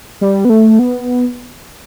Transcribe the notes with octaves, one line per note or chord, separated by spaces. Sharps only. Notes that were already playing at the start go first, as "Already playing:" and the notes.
G3
B3
A3
B3